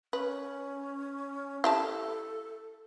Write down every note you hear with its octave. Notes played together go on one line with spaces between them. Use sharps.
C#4 B4
E4 G4 A4 A5